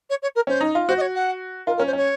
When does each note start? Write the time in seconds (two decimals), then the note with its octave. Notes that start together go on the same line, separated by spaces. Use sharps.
0.09 C#5
0.22 C#5
0.35 A#4
0.47 C#4 C5
0.61 D#4
0.75 F4
0.88 F#4 C5
0.97 D#5
1.01 C#5
1.14 F#5
1.66 F4 A#4
1.77 A#4
1.79 C#4
1.86 C5
1.93 C#4 C#5